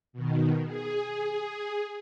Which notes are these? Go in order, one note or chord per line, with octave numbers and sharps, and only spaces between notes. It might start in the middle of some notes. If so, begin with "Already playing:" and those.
B2 D#3
G#4